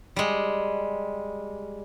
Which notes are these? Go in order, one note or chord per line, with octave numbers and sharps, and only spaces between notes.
G3 G#3